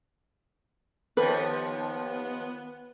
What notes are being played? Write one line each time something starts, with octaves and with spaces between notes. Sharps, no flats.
D#2 F3 B3 B4